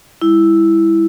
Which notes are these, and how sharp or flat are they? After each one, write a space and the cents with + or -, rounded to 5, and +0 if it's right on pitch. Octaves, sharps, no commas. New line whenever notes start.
G3 +40 E4 +0